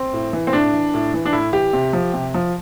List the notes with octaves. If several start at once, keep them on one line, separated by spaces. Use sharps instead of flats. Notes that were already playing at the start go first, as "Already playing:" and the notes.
Already playing: C4
A2
E3
C4
A2 D4
E3
A2
E3
D4
A2 E4
E3 G4
C3
F3
C3
F3